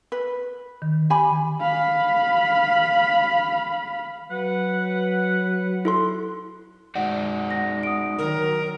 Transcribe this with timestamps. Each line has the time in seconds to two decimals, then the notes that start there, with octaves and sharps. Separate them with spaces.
0.12 B4
0.82 D#3
1.10 G4 G#5 B5
1.61 F5 B5
4.31 F#3 B4 F#5
5.85 E4 A4 C6
6.95 G#3 D#4 F#4 D5 F#5
7.51 F#5 A#6
7.83 D#6 D7
8.18 D#3 F#3 A#4